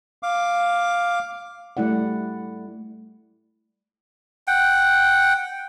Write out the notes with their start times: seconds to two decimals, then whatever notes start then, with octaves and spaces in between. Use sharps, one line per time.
0.23 F5 D6
1.77 G3 A3 E4 D5 F#5
4.47 F#5 G5